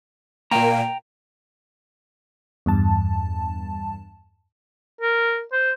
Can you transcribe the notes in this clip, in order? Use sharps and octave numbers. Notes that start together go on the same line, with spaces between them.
A#2 A#3 G5 A#5
E2 G2 A5
A#4
C5